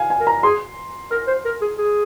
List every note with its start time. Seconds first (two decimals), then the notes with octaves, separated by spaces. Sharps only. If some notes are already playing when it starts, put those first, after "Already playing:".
Already playing: F5 G#5
0.10 G#5
0.21 A#4
0.27 A#5
0.43 G#4 C6
1.11 A#4 F6
1.27 C5
1.45 A#4
1.61 G#4
1.78 G#4